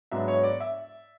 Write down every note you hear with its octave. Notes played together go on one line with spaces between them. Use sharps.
G#2 F#3 B3 D4 E5
C#5
D5
E5